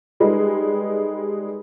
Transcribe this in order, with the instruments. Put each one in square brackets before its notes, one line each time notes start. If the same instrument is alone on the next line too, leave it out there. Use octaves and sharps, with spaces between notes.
[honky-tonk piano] G3 G#3 D#4 A4 B4